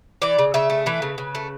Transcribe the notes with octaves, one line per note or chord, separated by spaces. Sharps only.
E3 D5
C#3
C#3 E5
A3
E3 B4
C#3
C#3
A3